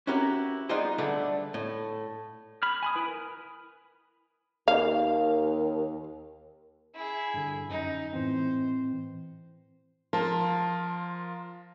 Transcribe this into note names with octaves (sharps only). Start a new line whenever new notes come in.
C#4 E4 F#4 G4 A#4 B4
G3 B3 D#4 F4 G#4 C5
D3 G3 A3 D4 A4 B4
A2
B5 F6
G#5 B5 D#6
E4 B4
A#4
D#2 F5
E4 G#4
G2 D3
F#2 D#4
A2 E3 C4 C5
F3 F4 A#4 A5